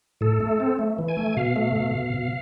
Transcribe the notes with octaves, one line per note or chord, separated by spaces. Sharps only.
A2 A4
A3
C4
A3
E3
G#5
A3
B2 F5
A3
B2
B2
B2